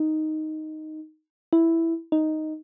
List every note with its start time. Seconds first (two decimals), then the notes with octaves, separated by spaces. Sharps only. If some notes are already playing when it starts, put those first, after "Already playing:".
Already playing: D#4
1.53 E4
2.12 D#4